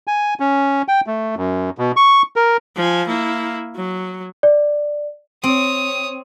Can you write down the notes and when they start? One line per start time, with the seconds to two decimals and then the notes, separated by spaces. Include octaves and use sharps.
0.07 G#5
0.40 C#4
0.88 G5
1.07 A3
1.37 F#2
1.78 B2
1.97 C#6
2.36 A#4
2.76 F3 G#5
3.07 A#3 E4
3.75 F#3
4.43 D5
5.44 C4 C#5 D#6